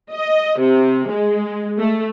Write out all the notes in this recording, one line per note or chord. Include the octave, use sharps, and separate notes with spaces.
D#5
C3
G#3
A3